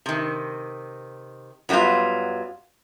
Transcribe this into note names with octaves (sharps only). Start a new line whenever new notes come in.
C3 D#3
F#2 F#3 G3 A3 B3 F4